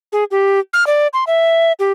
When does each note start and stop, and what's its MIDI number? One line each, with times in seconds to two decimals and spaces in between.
0.12 0.24 68
0.31 0.60 67
0.73 0.86 89
0.87 1.07 74
1.13 1.24 84
1.27 1.72 76
1.79 1.92 67